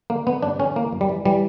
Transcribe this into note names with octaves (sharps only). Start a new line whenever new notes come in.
D3 A#3
D3 B3
G2 D4
D3 C#4
E3 A#3
F#2
G3
E3
E3 G3